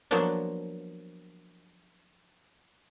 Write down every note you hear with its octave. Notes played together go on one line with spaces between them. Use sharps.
F3 F#3 A#3 B3 D4